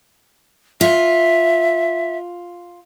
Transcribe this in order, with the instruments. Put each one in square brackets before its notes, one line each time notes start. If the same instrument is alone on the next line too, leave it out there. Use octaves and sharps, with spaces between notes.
[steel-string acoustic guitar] F4 [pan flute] E5